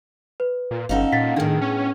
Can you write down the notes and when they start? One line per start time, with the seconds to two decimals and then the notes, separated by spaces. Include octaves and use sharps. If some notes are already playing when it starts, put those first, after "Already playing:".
0.40 B4
0.71 A#2
0.89 G1 C#4 D#4 A4 F5 F#5
1.13 A#2 A6 B6
1.36 A2 D#3 B3 D4 G#4
1.61 C#4